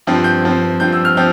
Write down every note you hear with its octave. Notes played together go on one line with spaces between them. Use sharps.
G2 F3 C4
G6
G2 F3 C4
G2 F3 C4 G6
E6
F6
F3 C4 G6